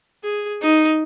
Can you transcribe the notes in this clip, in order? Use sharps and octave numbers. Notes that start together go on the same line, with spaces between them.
G#4
D#4